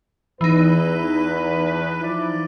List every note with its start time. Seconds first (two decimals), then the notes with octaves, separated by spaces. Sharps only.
0.41 E2 E3 D#4 B4
2.02 F3 E4 D5